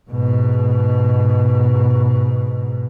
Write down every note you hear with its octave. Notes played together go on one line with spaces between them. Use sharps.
G#2 B2